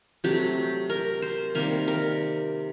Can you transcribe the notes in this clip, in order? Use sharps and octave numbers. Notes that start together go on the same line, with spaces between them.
C3 F#3 A3 G4
A#4
C5
C3 D#3 G3 A#3 A#4
A#4